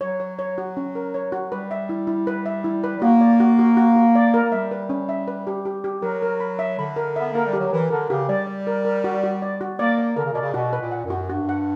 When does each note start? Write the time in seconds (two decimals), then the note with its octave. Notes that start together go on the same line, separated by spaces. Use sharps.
0.01 F#3 C#5
0.20 C#5
0.39 C#5
0.58 F#4
0.77 C#4
0.95 A#4
1.14 C#5
1.32 F#4
1.51 G3 B4
1.71 E5
1.89 E4
2.07 E4
2.27 B4
2.46 E5
2.64 E4
2.84 B4
2.97 G3
3.01 A#3 F#4
3.21 D5
3.40 F#4
3.59 F#4
3.77 F#4
3.96 F#4
4.15 D5
4.34 A#4
4.43 A#3
4.52 G3 E5
4.71 B4
4.89 C#4
5.09 E5
5.28 B4
5.47 G4
5.65 G4
5.84 G4
6.02 F#3 A#4
6.22 A#4
6.40 B5
6.59 E5
6.78 D3 B5
6.96 A#4
7.16 B3 E5
7.32 A#3 A#4
7.46 G3
7.53 G4
7.59 F#3
7.72 E3 A#4
7.90 D3 A#4
8.10 C#3 G4
8.28 G3 D5
8.47 D5
8.67 A#4
8.85 A#4
9.04 F#4
9.23 F#4
9.42 D5
9.61 F#4
9.79 A#3 D5
9.98 D5
10.16 D3 A#4
10.25 C#3
10.33 B2 D5
10.41 C#3
10.54 B2 F#4
10.73 B4
10.80 A#2
10.91 F#5
11.05 F#2
11.10 F#4
11.30 G2 F#4
11.49 F#5